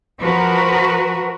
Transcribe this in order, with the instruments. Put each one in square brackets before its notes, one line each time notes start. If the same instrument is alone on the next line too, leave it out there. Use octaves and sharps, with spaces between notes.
[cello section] F3 F#4 A#4 B4